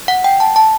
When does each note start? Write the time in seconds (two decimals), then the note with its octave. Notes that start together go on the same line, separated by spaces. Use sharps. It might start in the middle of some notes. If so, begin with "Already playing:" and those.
0.08 F#5
0.24 G5
0.40 A5
0.56 A5